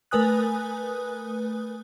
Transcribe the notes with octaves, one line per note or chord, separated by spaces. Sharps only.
A3 A#4 B4 G#5 D#6 F#6